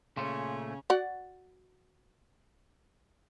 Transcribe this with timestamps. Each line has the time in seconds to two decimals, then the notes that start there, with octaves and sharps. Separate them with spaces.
0.17 A#2 C#3 A3 C#4 G#4 C6
0.90 F#4 D5 F#5